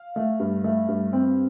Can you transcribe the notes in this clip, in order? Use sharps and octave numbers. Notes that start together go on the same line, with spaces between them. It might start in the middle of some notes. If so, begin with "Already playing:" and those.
Already playing: F5
A3
G2
A3
G2
C4